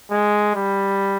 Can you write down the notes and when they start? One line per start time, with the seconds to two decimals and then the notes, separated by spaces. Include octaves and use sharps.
0.11 G#3
0.55 G3